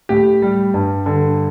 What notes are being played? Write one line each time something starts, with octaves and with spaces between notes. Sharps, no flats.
A2 G4
G3
G2
D3